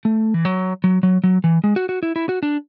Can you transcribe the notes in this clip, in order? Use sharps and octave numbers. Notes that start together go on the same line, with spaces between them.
A3
E3
F#3
F#3
F#3
F#3
E3
G#3
F#4
F#4
E4
E4
F#4
D4